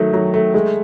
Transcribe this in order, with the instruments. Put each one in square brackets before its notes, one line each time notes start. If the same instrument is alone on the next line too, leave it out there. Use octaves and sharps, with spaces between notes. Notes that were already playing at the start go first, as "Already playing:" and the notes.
Already playing: [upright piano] D#3 F#3 A3
F#3
A3
G#3